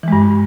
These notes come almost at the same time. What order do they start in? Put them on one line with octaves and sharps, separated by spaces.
E3 G#3 G2